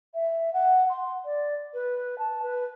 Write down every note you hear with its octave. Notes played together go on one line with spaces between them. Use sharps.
E5
F#5
C6
D5
B4
A5
B4